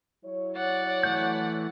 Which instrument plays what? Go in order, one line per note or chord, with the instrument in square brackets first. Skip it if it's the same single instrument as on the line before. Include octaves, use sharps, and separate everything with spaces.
[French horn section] F#3 E4 C#5
[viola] D5 F#5
[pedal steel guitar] E3 A3 G6